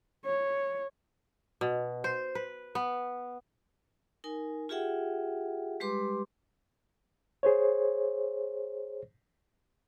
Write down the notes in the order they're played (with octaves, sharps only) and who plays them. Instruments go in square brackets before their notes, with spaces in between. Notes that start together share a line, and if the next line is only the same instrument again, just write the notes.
[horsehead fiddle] C#5
[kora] B2
C5
B4
B3
[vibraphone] D#4 A#4 G#5
F4 G4 G#4 E5 F#5 G5
G3 G#3 G4 B4 C6 D6
[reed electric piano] G#4 C5 C#5